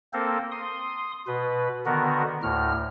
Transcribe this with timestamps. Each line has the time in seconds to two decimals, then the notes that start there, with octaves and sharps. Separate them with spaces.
0.13 A#3 C4 A4 A#4 C5
0.52 C6 D#6
1.27 B2 B4
1.86 D3 D#3 B3 F#4 A#4
2.43 D2 A2 F6